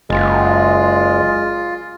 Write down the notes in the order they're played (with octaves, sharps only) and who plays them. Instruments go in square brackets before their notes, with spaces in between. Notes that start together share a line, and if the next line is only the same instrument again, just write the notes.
[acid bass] F#1 [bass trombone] G#3 [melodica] F4